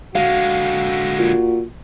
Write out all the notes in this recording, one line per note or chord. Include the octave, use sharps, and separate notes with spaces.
D3 G#3 F#4 F5
A#2